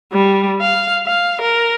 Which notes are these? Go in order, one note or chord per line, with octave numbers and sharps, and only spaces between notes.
G3
F5
F5
A#4